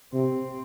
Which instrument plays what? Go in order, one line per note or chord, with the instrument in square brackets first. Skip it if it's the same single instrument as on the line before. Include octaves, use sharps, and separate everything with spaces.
[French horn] C3 [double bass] C4